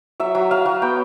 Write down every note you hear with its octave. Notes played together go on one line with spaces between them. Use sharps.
F#3 E5
F#3
F#3 F5
F#3
B3 G5